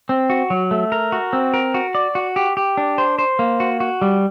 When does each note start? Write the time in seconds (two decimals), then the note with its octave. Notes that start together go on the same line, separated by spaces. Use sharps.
0.09 C4
0.30 F#4
0.50 F#3
0.71 A3
0.92 A#4
1.12 F#4
1.33 C4
1.54 A#4
1.74 F#4
1.95 D5
2.15 F#4
2.36 G4
2.57 G4
2.77 D4
2.98 C5
3.19 C5
3.39 A#3
3.60 F#4
3.80 F#4
4.02 G3